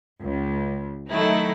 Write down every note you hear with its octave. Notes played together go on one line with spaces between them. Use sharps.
C#2
D#3 F#3 A3 D#4 E4